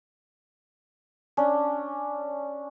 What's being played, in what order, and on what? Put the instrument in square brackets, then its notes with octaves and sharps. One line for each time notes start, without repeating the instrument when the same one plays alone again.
[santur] C#4 D4